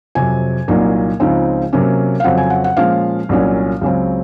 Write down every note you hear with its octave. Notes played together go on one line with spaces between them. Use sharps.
F2 C3 F#3 G#5
C2 A#2 F#3 A#3 D#4
C#2 C#3 F3 C4 D#4
C3 F#3 A#3 C#4
F5
F2 C#3 F#3 C4 F#5
G#5
F#5
F#5
A#2 F3 G#3 C#4 F5
C2 A#2 F#3 A#3 C#4
C#2 C#3 F#3 C4